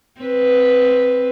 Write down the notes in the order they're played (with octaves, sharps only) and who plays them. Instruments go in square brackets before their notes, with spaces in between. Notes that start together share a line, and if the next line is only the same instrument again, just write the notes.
[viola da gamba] C4 B4